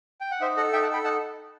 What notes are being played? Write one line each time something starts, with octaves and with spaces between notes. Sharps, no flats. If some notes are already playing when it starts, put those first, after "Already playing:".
G5
F#5
D#4 C5 E5
A4 D#5 F#5
D#4 E5 G5
F#5 A5
A4 G5 B5
D#4 F#5 A5